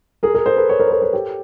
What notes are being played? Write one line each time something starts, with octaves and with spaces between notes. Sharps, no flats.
G#4 A#4
G#4 A#4
A#4 C5
A4 B4
C#5
A#4 C5
B4
A#4 C5
B4 C#5
G4 A4